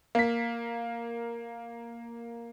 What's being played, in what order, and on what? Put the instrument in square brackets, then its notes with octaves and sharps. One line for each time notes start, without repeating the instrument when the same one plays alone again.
[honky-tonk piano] A#3 B6